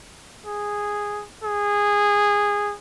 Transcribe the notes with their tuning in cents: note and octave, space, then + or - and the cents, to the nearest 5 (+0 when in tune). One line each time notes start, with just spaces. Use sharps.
G#4 -5
G#4 -15